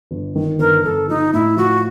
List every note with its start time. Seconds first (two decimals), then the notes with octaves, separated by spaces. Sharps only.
0.11 G1
0.35 D#3
0.59 G1 A#4
0.84 G1 A4
1.09 F3 D#4
1.33 A2 E4
1.57 F3 F#4